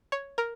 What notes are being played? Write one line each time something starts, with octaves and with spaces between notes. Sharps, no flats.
C#5
A#4